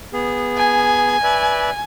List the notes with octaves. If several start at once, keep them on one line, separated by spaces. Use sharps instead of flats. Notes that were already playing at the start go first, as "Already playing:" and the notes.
B3 G#4
G#5
B4 D5 E5